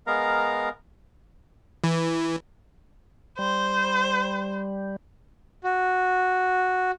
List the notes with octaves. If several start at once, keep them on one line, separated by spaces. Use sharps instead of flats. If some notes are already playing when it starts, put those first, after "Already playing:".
G#3 B3 A#4 F5 A#5
E3
G3 C5
F#4